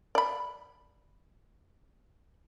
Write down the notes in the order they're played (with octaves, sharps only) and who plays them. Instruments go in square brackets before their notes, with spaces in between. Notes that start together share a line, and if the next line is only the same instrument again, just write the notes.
[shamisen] D5 B5